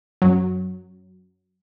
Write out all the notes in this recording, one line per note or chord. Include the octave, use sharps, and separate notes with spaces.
F#2 F#3